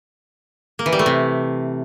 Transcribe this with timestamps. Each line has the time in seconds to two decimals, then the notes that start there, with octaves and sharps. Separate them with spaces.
0.79 A#3
0.86 E3
0.93 G3
0.99 A3
1.06 C3